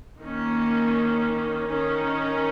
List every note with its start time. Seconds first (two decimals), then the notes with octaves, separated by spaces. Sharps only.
0.21 D#3 A#3 C#4
1.69 D#3 C#4